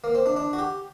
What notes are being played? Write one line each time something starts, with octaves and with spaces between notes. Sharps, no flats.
A#3
C4
D4
D4
F#4
G4